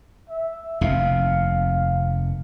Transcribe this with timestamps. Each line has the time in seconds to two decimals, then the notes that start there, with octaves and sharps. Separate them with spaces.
0.29 E5
0.81 F1 D#2 C3 F5